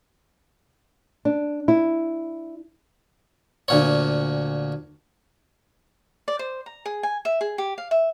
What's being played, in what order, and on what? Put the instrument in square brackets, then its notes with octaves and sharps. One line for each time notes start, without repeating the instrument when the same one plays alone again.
[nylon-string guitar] D4
E4
[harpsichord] D2 A#2 C#5
[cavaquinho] D5
C5
A#5
G#4
G#5
E5
G#4
G4
F5
E5